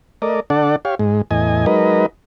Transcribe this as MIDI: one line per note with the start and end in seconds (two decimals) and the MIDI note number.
0.22 0.40 57
0.22 0.40 70
0.22 0.40 74
0.22 0.40 75
0.50 0.76 50
0.50 0.76 62
0.50 0.76 69
0.50 0.76 74
0.50 0.76 78
0.85 0.95 67
0.85 0.95 73
0.85 0.95 77
0.99 1.22 44
0.99 1.22 56
1.31 1.66 40
1.31 1.66 45
1.31 1.66 75
1.31 1.66 80
1.66 2.06 54
1.66 2.06 56
1.66 2.06 63
1.66 2.06 70
1.66 2.06 71
1.66 2.06 75